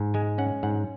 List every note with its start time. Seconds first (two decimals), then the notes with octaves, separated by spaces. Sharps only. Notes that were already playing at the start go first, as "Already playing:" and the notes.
Already playing: G#2
0.14 G#3 G#5
0.38 C#4 F#5
0.63 G#2 F#5